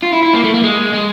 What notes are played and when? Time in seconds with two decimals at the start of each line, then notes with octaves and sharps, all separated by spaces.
0.02 F4
0.13 E4
0.23 E4
0.33 A#3
0.43 A3
0.54 A#3
0.63 G#3
0.94 G#3